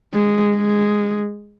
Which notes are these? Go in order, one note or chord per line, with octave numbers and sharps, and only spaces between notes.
G#3
G#3